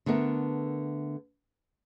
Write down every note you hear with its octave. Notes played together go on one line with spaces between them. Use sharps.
D3 A3 B3 A#4 E5